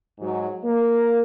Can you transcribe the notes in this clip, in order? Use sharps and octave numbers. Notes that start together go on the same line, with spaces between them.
G#2 F#3
A#3